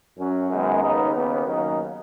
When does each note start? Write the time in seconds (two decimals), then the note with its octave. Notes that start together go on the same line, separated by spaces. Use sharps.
0.17 F#2 F#3 C#4
0.49 F#2 D#3 G#3 B3
0.82 D#2 C#3 B3 D#4
1.14 D#2 C#3 B3
1.46 D#2 C#3 F#3 D#4